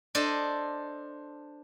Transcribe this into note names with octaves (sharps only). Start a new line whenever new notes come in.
D4 A4 C5 D#5